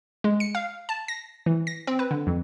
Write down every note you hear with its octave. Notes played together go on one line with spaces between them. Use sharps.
G#3
C#7
F5
A5
A#6
E3
A#6
C4
B4
D3
F2